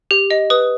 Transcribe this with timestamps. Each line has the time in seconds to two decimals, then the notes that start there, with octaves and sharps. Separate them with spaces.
0.11 G4
0.31 D#5
0.50 B4 D#6